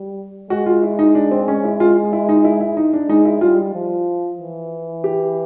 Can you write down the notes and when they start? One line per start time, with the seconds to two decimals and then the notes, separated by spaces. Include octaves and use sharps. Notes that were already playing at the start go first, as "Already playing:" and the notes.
Already playing: G3
0.50 G#3 F#4
0.66 F4
0.83 E4
0.99 D#4
1.15 D4
1.31 C4
1.48 C#4
1.64 E4
1.80 F4
2.13 E4
2.29 D#4
2.45 E4
2.61 E4
2.77 D#4
2.93 D4
3.09 G#3 D#4
3.25 E4
3.41 G3 F4
3.74 F3
4.39 E3
5.04 G4